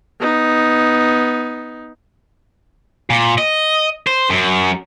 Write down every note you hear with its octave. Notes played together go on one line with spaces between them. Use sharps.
B3 D#4
A#2
D#5
C5
F#2